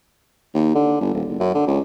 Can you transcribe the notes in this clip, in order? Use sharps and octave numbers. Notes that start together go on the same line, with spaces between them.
D#2
D3
G1
D#1
F#1
F#2
D3
C#2